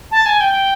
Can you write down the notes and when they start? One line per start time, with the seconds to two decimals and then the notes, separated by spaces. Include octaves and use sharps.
0.11 A5
0.26 G#5
0.41 G5